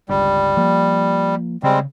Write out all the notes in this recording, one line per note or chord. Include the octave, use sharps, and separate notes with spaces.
G1 C#2 G3
F3 A#3
C#3 G3 G#3 C4